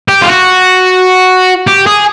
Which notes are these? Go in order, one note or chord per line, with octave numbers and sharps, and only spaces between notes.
G4
F4
F#4
G4
G#4